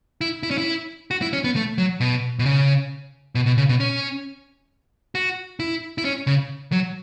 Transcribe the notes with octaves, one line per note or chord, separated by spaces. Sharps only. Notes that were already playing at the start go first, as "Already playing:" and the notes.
E4
E4
C#4
E4
F#4
E4
C#4
B3
A3
F#3
B2
B2
C#3
B2
B2
C#3
B2
C#4
F#4
E4
E4
C#4
C#3
F#3